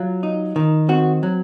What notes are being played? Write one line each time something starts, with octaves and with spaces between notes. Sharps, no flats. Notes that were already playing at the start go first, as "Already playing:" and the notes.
Already playing: F#3 F4
D#4
D#3
C4 F#4
F#3